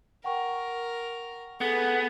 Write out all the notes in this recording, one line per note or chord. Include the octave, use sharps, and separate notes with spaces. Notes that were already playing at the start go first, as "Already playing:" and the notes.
A#4 F#5 G5 C#6
B3 G#4 A4 B4